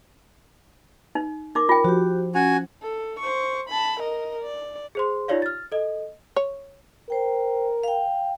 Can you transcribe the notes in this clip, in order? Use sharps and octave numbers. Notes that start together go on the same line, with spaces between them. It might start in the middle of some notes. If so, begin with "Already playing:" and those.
D#4
D#4 A#4 D6
F4 G5
F3 F#4 G4
C#4 F#4 G#5
A4
C5 C#6
A5 B5
A#4 D#5
D5
G#4 C5 C6
D#4 F4 G4 C#5 D5 F5
F6 A6
A4 D#5
C#5
A#4 C5 G5
F5 G5